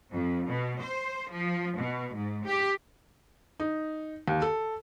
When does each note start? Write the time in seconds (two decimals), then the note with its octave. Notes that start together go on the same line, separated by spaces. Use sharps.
0.11 F2
0.47 B2
0.81 C5
1.31 F3
1.79 B2
2.15 G#2
2.46 G4
3.60 D#4
4.28 D#2
4.42 A4